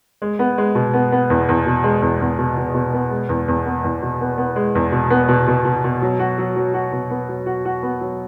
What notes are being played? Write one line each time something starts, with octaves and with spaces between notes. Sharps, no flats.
G#3
B3
G#3
B2
B3
B3
E2
E2
B2
G#3
E2
E2
B2
B2
B2
B3
G#3
E2
E2
B3
E2
B2
B3
B3
G#3
E2
B2
B3
B2
B2
B2
B2
F#3
F#4
F#3
F#3
F#4
B2
B3
F#3
F#4
F#4
B3
F#3